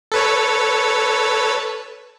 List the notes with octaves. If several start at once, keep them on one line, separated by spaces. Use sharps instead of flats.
A4 B4 C#5